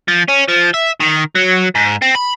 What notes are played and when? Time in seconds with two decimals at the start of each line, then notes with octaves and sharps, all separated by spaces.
0.08 F3
0.28 C#4
0.48 F3
0.74 E5
1.01 D#3
1.35 F#3
1.75 G#2
2.02 C4
2.15 B5